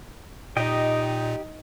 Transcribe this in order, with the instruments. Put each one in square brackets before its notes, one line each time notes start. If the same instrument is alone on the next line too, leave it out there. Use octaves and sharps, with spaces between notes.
[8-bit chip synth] A#2 [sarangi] D#4 [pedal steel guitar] G4 D#5 G5